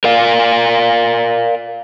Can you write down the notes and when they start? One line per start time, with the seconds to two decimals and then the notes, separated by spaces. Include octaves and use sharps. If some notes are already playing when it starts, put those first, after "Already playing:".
0.04 A#4 D5 F5